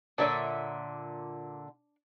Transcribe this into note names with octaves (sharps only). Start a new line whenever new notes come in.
A#2 D3 D4 C#5 D5 E5